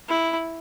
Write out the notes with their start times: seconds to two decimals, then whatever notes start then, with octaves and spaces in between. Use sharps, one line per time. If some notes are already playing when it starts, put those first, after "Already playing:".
0.09 E4